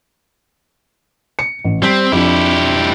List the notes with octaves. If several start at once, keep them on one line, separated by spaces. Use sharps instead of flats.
C#7
A1
G3 C4 B6
F2 D4 E4 G4